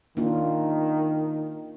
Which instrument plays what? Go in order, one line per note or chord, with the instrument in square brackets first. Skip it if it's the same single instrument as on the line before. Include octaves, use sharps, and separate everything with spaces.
[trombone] D#3 [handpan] A#3 D4 F4